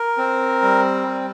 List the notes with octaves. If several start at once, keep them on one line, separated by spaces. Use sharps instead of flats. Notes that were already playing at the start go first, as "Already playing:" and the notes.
Already playing: A#4
C4
G3
G3